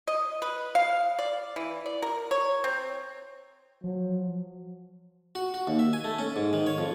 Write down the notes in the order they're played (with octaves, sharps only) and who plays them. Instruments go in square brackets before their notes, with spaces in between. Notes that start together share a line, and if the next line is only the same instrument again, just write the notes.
[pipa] D#5
B4
F5
D5
E3
D5
A#4
C#5
C4
[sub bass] F3 [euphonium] F#3
[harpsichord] F#4
F#4
D#2
E5
G#5
A3
C#4
G#2
D#3
C#5
F2